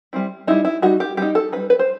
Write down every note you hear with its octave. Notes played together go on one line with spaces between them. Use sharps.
G3 C4 E4
G3 D#4 E4
E4
G3 D#4 F#4
G4
G3 D#4 G4
A4
G3 D#4 B4
B4
C5